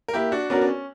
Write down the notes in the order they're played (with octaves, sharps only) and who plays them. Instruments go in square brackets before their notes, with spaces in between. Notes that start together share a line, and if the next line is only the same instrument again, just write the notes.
[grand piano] A#4
[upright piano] A#3 [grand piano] E4 G4
[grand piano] D4 F#4
[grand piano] B3 D4 [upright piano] C#4 F#4 A#4
[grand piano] D4
C#4